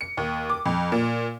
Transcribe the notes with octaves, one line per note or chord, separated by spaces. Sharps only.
C#7
D#2
D6
F2
A#2